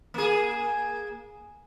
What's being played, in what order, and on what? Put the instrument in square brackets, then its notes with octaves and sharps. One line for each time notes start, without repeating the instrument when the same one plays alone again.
[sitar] A#3 G#4